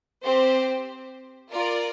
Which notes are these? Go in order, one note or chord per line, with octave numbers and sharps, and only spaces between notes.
C4 G4 C5
F4 A#4 D5